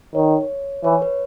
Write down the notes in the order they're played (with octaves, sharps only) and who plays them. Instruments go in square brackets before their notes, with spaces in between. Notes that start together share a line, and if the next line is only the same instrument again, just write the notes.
[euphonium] D#3 [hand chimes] C#5
[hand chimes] C#5
[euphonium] E3 [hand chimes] C#5
[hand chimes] B4